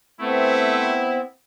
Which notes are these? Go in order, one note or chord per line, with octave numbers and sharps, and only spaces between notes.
A3 B3 C4 E4